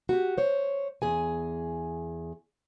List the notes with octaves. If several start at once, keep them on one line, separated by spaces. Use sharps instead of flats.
F#4 G4
C5 C#5
E2 G#4 G#5